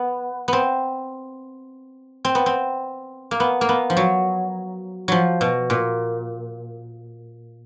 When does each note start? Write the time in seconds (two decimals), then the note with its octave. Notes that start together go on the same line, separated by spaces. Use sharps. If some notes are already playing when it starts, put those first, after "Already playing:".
Already playing: B3
0.48 B3 C4
2.25 C4
2.35 B3
2.46 C4
3.31 A#3
3.40 B3
3.61 A#3
3.69 B3
3.90 F3
3.97 F#3
5.08 F3 F#3
5.41 B2
5.70 A#2